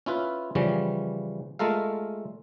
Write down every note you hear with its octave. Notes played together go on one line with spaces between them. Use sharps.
C#4 E4 F4 B4
C#3 E3 F3 G3 C#4
G#3 A3 F4 A4 A#4 F5